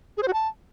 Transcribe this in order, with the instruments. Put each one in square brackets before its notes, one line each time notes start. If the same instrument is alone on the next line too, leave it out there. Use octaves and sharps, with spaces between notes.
[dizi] G#4
C5
F#4
A5